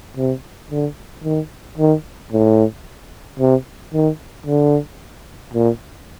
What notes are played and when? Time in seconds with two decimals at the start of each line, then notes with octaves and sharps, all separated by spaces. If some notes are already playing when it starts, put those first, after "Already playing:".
0.17 C3
0.71 D3
1.24 D#3
1.78 D#3
2.32 A2
3.39 C3
3.93 D#3
4.46 D3
5.54 A#2